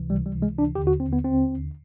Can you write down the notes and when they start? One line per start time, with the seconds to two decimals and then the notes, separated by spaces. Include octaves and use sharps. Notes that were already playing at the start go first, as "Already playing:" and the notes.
Already playing: C#2 C3 E3
0.10 G3
0.26 G3
0.42 G#3
0.58 D4
0.75 D#2 G4
0.78 D3
0.87 F#4
1.00 C4
1.13 B3
1.25 C4